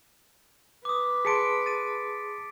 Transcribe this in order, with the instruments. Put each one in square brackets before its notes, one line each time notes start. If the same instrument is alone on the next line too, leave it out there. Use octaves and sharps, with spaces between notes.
[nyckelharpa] B4 [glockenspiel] D6 D#6
[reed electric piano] G#4 A5 C6 [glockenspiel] B6 C#7 D7
[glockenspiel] A6 D#7